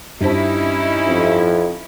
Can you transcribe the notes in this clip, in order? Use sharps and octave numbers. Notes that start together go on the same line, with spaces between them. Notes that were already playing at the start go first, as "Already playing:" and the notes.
G2 C#4 D#4 E4 C5 A5
F2